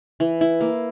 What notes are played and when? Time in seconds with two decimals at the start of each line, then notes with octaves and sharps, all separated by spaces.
0.20 E3
0.41 E4
0.61 A#3